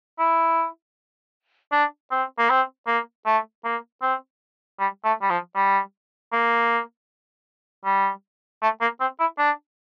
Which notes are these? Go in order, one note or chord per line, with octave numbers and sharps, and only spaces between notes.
E4
D4
C4
A#3
C4
A#3
A3
A#3
C4
G3
A3
G3
F3
G3
A#3
G3
A3
A#3
C4
E4
D4